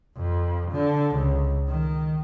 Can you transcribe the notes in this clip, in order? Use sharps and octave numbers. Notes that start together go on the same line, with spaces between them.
F2
D3
C#2
D#3